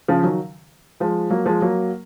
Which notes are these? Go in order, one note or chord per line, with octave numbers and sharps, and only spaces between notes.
C#3 F3
D#3 F#3
F3 G#3
F#3 A#3
F3 G#3
F#3 A#3